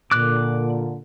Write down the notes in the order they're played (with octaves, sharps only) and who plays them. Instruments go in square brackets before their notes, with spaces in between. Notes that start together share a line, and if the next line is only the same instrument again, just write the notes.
[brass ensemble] A#2 D3 [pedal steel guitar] D6 F#6